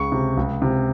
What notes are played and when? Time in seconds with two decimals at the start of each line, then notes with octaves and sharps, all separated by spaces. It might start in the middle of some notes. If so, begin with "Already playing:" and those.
Already playing: C#2 C#3 C#6
0.12 C3
0.37 C#2
0.62 C3